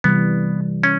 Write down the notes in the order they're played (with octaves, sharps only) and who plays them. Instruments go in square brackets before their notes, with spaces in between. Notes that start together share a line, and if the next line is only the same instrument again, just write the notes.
[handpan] C3 E3 G3 [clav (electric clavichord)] B3
[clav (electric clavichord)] C#4